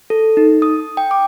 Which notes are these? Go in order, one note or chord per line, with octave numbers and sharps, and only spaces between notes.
A4
D#4
D#6
G5
D6